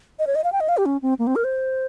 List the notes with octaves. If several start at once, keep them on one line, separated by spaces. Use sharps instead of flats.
D#5
C#5
D#5
F5
G5
D#5
F5
G4
C#4
C4
A#3
C4
A#4
C5